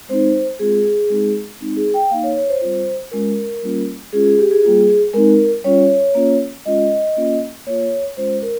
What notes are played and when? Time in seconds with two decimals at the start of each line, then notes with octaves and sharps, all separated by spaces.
0.08 G#3 C4 D#4 C5
0.59 G#3 C4 F4 G#4
1.10 G#3 C4 D#4
1.61 G#3 C4 D#4
1.77 G#4
1.94 G5
2.10 A#3 D#4 F5
2.23 C#5
2.37 C#5
2.49 C5
2.62 G3 C4 F4
3.11 G#3 C#4 F4 A#4
3.62 G3 A#3 C#4 F4
4.13 G#3 C#4 F4 G#4
4.26 G#4
4.39 G4
4.51 G#4
4.63 G3 A#3 F4 G#4
5.14 G#3 C4 D#4 A#4
5.64 G3 C#4 F4 C#5
6.15 A#3 C#4 F4
6.66 G#3 C#4 F4 D#5
7.17 A#3 C#4 F4
7.67 A#3 F4 C#5
8.17 G#3 C#4 F4 C5
8.42 A#4